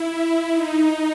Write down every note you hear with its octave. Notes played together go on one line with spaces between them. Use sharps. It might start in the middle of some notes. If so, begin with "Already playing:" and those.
Already playing: E4
D#4